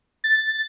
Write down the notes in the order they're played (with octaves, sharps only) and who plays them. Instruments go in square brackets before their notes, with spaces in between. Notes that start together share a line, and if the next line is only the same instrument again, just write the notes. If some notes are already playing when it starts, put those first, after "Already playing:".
[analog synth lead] A6